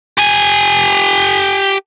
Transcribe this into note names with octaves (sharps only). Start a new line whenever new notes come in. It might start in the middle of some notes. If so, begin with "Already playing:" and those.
G4 G#5